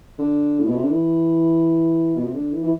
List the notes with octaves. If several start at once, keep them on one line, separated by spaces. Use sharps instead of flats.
D3
A2
B2
C3
D3
E3
B2
C3
D3
E3
E3